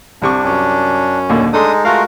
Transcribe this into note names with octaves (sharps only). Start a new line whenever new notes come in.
C2 C3 D4 C#6
F#2 C#4
D#2 A#2 D3
G#3 A3 D4 D#4 A4 C6 D#6
G#3 A3 F4 F#4 A#4 F5